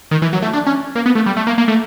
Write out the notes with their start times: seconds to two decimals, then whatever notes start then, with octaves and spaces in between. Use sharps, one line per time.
0.11 D#3
0.22 E3
0.33 F#3
0.42 A3
0.53 D4
0.66 C#4
0.95 A#3
1.06 B3
1.15 A3
1.26 G3
1.37 A3
1.47 A#3
1.58 A#3
1.68 A3